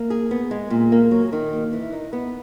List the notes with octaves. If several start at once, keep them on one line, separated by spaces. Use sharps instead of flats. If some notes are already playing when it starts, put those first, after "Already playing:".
Already playing: A#3
G#4
B3
G#3
A#2
A#3
F#3
D#3
A#3
E3
D#4
B3